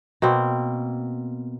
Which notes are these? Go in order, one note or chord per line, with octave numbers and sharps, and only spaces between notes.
B2 A#3 C4